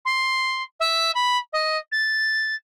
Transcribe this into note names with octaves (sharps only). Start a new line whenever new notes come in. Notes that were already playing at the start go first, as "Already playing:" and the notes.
C6
E5
B5
D#5
A6